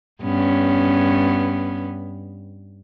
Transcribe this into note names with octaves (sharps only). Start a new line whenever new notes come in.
G2 B3 C#4